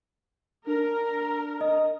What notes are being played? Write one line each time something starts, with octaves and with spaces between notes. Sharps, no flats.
D4 A#4
D#5 D#6